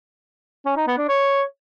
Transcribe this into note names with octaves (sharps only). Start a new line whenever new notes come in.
C#4
D#4
B3
D4
C#5